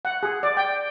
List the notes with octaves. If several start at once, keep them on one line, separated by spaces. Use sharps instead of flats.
F#5
G#4
D5
G5